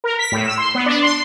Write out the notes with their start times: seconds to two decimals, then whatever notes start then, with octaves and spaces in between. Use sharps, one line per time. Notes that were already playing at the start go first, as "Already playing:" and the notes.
0.04 A#4
0.19 B6
0.32 A2
0.46 E6
0.58 C6
0.75 B3
0.86 D4
1.02 C6